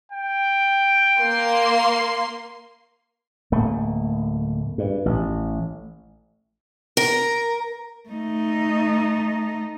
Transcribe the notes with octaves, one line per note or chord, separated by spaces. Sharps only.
G5
A#3 C6
D1 A3 A#3
G2
A1
A#4
A3 D#4